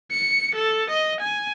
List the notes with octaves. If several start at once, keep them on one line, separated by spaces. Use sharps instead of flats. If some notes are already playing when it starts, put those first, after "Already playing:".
C#7
A4
D#5
G#5